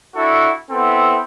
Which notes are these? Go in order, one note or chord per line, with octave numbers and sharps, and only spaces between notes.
D4 E4 F#4 A4
B3 C4 E4 A4